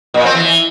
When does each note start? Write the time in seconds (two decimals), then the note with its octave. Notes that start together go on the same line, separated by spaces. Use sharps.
0.14 A#2
0.25 C4
0.35 E3